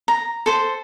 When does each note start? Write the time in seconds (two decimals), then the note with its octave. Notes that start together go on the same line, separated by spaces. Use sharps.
0.08 A#5
0.46 A4 C5